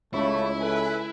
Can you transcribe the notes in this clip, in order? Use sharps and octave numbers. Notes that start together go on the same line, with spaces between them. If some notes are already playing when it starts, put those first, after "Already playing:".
C#2 C#3 A3 E4 C#5 B5 C#6
A4 B4 G#5